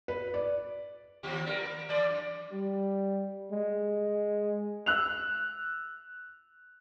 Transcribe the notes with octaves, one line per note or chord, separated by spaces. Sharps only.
B4
D5
D#2 F3 G4
G3 E4 A#4
A#3
E3 D5
F#2
G3
G#3
E6 F#6 F7